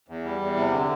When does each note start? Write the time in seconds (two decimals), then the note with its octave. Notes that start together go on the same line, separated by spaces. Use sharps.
0.08 E2
0.25 G3
0.41 E2
0.56 C3
0.73 D3